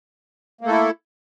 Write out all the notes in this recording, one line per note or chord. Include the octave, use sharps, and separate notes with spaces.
A3 A#3 E4 A4